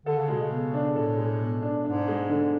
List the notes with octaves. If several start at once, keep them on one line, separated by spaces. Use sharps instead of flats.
D3 A4
C#3
B2 G#3
C#3
B2
D4
A2 A4
G#3
B2
D4
G#2 D4
G#3
D3